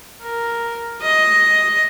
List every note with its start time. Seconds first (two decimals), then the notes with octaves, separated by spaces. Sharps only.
0.22 A#4
1.02 D#5